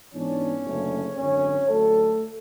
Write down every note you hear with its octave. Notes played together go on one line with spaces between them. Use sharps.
G#2 E3 B3 C#4 D4 C#5
F#1 F#2 D3 A3
G#1 F#2 D3 C#4 C#5
D2 D3 F#3 A3 A4